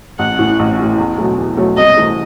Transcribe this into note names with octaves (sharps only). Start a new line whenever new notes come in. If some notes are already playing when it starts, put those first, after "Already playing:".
A1 F#5
A2 E3
A1
A2 E3
E2
B2 F#3 A3
E2
B2 F#3 A3
C2 D#5
C3 E3 A3